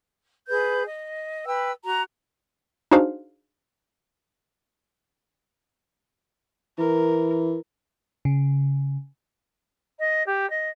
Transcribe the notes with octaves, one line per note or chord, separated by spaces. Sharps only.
G#4 B4 G6
D#5
B4 G5 E6
F#4 A#5
D4 D#4 F#4 G#4 C5 F5
E3 A#4
C#3
D#5
G4
D#5